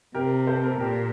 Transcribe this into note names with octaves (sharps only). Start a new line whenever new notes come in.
C3 G4 A#4
A4 C5
A#4
A4
A#2 G4 A#4